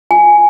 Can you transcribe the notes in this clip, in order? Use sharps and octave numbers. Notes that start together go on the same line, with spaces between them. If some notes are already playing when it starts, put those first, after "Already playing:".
G#5